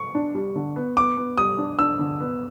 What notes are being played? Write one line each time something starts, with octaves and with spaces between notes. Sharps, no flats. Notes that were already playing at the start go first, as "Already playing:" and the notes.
Already playing: C#6
D4
G3
D3
B3
B3 D6
B3
G3 D#6
D4
D4 E6
D3
B3